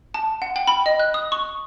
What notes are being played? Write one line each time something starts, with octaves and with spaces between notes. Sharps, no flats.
A5
F#5
G5
B5
D#5
F#6
D#6
C#6